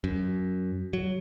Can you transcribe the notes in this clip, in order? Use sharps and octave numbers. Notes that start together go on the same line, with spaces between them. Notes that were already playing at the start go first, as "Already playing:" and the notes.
F#2
F#3